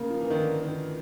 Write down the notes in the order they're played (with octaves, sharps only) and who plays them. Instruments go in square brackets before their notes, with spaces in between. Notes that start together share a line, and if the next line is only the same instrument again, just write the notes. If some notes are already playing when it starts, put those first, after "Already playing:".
Already playing: [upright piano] C#3 [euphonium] A#3
[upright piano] F3
E3
D#3
D3
D#3